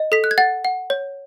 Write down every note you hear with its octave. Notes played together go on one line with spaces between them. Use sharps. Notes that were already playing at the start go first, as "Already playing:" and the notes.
Already playing: D#5
A4 B6
F#6
G#6
F#5 A6
F#5
C#5